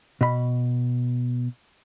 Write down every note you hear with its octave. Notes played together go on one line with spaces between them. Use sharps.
B2 B5